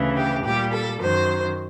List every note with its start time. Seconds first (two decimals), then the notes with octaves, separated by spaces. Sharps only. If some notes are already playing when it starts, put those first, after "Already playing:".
Already playing: D2 C#3 E3
0.16 G4
0.44 A#2 G3 G4
0.73 A4
1.01 F#2 D#3 F#3 C5